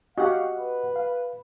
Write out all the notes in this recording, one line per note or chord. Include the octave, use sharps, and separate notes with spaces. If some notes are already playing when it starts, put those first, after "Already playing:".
F#4 G4 D#5 F5 F#5
B4
F5